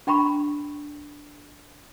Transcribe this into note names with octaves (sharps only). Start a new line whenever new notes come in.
D4 G5 A#5 B5 C#6